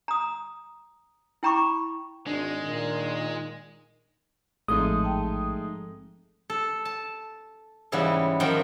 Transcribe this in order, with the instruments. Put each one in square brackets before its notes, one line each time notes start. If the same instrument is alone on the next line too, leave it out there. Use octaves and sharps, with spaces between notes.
[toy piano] A#5 D#6
E4 G5 A#5 B5 C#6 D6
[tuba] G#1 [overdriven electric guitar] G#3 [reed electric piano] D4
[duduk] A#2 [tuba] D#3
[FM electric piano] A1 D#6 [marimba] G#2 F3 C4 [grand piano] G#3 A3 D#4
[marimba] G5 A5
[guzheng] A4
A5
G#2 C#3 E3 G3 B3
F#2 D#3 F3 F#4 G5